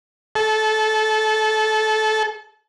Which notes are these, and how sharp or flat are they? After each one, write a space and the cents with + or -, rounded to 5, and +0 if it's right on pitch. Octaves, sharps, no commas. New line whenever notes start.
A4 -20